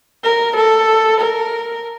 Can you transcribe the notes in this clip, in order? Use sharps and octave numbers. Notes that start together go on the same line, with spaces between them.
A#4
A4
A#4